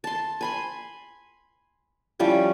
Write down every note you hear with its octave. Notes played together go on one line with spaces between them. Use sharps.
A5 C6
G#5 B5 C6
F3 G3 C#4 E4